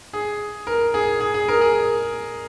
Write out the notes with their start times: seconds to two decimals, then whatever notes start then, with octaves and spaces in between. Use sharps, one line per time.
0.13 G#4
0.67 A#4
0.94 G#4
1.20 G#4
1.34 G#4
1.48 A#4
1.61 G#4